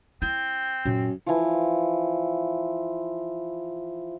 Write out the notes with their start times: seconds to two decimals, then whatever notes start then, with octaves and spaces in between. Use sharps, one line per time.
0.22 C4 E4 G6
0.85 F#2 A#2
1.26 E3 F3